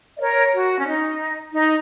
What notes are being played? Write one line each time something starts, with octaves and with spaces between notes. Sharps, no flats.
D#5
A#4 C#5
F#4
C#4
D#4
D#4